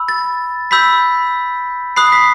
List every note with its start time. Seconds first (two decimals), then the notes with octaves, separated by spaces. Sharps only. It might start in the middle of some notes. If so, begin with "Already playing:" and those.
Already playing: B5 E6
0.08 A6
0.71 B5 E6 G6 B6
1.96 B5 D#6 F#6 C7
2.12 B6